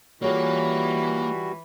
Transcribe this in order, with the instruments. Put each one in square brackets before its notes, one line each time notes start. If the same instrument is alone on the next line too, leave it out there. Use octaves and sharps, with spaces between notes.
[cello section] E3 [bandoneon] G3 F#4 [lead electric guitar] A#3 [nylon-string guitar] F4 G#4 C#5